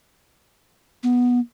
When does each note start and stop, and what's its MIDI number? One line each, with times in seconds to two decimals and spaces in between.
1.03 1.39 59